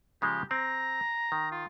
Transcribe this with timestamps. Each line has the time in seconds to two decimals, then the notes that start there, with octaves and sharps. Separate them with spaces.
0.22 C#3 F3 G#3 G4
0.51 C4 A#5
1.32 D#3
1.52 F4